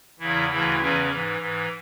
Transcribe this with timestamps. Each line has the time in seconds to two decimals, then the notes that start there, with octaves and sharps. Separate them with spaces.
0.19 E2 C#3 E3 E4
0.49 D2 C#3 E3 E4
0.80 E2 C#3 E3 C#4
1.10 G#2 E3
1.40 G#2 E3